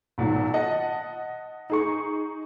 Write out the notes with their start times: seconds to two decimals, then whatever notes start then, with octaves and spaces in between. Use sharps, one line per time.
0.18 B1 A#2 D#3 F#3
0.54 D#5 F#5 A5
1.70 D#4 G#4 C#6